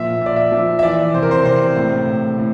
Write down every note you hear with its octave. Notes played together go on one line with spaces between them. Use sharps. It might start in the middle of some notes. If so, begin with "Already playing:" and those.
Already playing: A#2 F3 E5
A#2 D5
E5
F3
E5
E3 D5
C3 C5
A#4
C5
C3 C5
A2
A2
A2